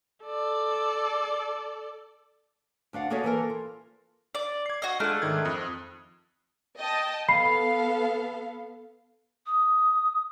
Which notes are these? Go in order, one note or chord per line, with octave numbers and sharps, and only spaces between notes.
A4 D5
D2 D4 F5 F#5
A#3 F#4 G#4 A4 C#5 E5
E3 A#3 A4 A#4
F4
D5
G#6 C7
F#4 D#5
G#3 A3 D4 F4 F6 F#6
G#2 D#3 G#6
F2 D#6
D#5 G5 A5
B3 A4 F5 B5 C7
D#6